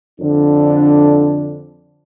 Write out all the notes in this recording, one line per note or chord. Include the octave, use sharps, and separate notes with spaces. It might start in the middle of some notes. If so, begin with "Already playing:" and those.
F2 D3 D4